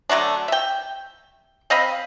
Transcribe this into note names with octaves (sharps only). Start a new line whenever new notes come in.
D3 F#3 A3 D4
E5 G5
C4 D#5 F5 B5